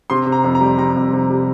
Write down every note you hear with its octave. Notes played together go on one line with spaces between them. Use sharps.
C3 C6
C3
A#5
F2
A#5
G3
G3 A#5
F2
C3
G3